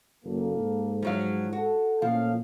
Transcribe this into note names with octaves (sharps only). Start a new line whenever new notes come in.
F#1 A#3 A4
G#2
F3 F#3 F5
F#4 A4
A#2 F3 A3 C#4 F5